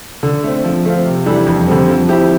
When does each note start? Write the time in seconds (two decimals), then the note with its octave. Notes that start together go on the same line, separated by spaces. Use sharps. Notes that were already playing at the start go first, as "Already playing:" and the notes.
0.23 D3
0.43 A3 C4
0.64 F3
0.85 A3 C4 F4
1.06 C3
1.26 E3 G3 D4 A4
1.46 F2
1.68 D3 G3 C4
1.88 F3
2.09 C4 E4 G4